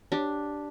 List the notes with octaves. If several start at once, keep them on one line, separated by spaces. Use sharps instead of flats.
D4 G4